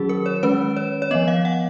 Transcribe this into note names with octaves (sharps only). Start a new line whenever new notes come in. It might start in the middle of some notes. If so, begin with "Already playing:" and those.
Already playing: D#3 F#3 C#4 F#4 G#4
A#4
C#5
D#3 G#3 C#4 B4
C#5
C#5
F3 B3 D#5
F5
F#5